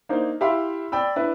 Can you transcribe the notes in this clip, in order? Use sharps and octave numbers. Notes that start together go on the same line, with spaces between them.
A#3 D4 D#4 C5
E4 G4 E5 F5 B5 C6
D5 G5 B5 E6
D4 E4 B4